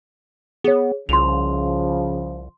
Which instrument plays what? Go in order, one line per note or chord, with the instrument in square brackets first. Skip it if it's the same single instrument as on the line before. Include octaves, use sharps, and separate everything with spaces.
[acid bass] B3 [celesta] G#4 C#5
[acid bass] C2 [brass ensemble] C#3 F3 [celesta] C6 F7